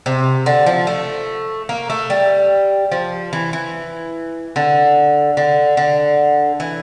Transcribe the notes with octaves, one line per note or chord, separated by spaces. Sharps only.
C3
D3
F3
A3
A#3
A3
G3
F3
E3
E3
D3
D3
D3
E3